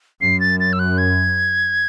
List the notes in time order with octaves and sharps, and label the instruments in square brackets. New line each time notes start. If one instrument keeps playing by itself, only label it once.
[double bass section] F#2 [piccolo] C7
[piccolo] A6
A6
E6
F#6
G#6